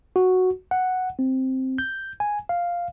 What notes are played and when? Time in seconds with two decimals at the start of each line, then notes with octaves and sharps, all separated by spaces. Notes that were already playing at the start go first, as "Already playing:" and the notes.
0.16 F#4
0.71 F#5
1.19 C4
1.78 G6
2.20 G#5
2.49 F5